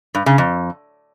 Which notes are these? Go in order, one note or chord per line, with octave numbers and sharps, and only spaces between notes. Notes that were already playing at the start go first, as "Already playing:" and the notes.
G2
C#3
F2